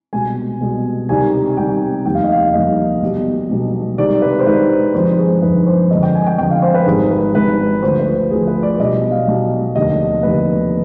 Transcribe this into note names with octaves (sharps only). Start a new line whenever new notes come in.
C2 B2 G#3 G#5
C2 B2 G#3
C2 C3 D#3 G3 G#5
C2 C3 D#3 G3 G5
F1 D#2 D#3 G3 G5
F5
D#5
F5
F1 D#2 D#3 G3 D#5
B1 B2 G3
B1 B2 G3
C2 C3 D#3 G#3 D5
B4
C5
C2 C3 D#3 G#3 B4
G1 F2 D#3 G#3 C5
G#4
G1 F2 D#3 G#3 B4
C5
F2 D3 G#3 D#5
G5
G#5
G5
F2 D3 G#3 G5
F5
C5
B4
G#1 G#2 D#3 G3 G#4
B4
G#1 G#2 D#3 G3 B4
D2 D3 F3 C5
B4
B4
D2 D3 F3 G#4
B4
D5
B1 B2 G3 D#5
F5
B1 B2 G3
F1 D#2 D3 D#5
F1 D#2 D3 B4